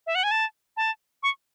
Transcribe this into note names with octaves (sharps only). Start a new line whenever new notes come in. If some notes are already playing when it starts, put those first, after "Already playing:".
E5
F#5
G#5
A5
A5
C#6